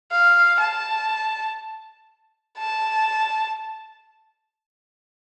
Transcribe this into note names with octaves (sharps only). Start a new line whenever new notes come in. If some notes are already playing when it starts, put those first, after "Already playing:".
F5
A5
A5